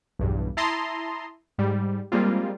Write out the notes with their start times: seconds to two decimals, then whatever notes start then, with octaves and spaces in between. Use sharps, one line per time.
0.19 B1 E2 G2
0.57 E4 A5 A#5 C6 D#6
1.58 G#2 G3
2.12 G3 G#3 A#3 C4 F4